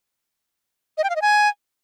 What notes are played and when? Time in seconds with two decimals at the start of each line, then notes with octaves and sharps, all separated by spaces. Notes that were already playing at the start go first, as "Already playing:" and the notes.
0.98 D#5
1.04 G5
1.10 F5
1.16 D#5
1.22 G#5